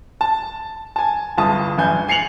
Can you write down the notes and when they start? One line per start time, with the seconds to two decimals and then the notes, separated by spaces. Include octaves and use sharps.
0.21 A5
0.96 G#5 A5
1.38 G1 C2 A5 D#6
1.78 A1 G2 G#5 G6
2.08 G#5 C7 C#7 F7 F#7